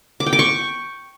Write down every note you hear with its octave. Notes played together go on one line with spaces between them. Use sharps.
D6
G5
D6
C#6